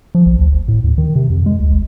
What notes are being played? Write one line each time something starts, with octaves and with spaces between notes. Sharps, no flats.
F3
A#1
D2
G#1
A2
D#2
D#3
C3
F2
G#3
D2
G#1